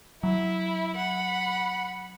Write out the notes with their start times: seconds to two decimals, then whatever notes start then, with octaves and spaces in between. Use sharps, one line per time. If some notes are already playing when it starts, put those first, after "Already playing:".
0.23 F#3 E4
0.97 F#5 B5